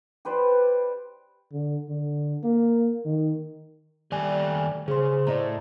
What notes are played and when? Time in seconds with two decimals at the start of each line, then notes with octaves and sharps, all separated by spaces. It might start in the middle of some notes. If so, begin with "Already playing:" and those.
0.25 G4 B4 C5 D5
1.52 D3
1.89 D3
2.44 A#3
3.05 D#3
4.12 D#3 G3 A3 D5 G#5
4.88 C#3 G#4 C5 C6
5.27 A2 D5 D#5 A#5